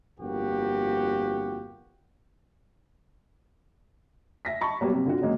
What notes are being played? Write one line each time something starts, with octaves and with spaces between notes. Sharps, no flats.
G1 F2 A#3 F#4 G4
E5 A#6 B6
A5 B5 C#6
A#2 F#3 G3 A#3 B3
C3
D3 F4 F#4
C#3 F#3 G#3 A#3